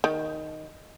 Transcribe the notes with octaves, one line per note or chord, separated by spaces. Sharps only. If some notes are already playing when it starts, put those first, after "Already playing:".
D#3